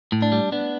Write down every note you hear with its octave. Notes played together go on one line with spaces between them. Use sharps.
A2
D4
G3
B3 D4